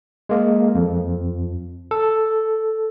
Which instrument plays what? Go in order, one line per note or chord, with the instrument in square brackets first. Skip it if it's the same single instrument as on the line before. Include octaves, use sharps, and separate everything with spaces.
[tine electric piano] G#3 A#3
F2
A4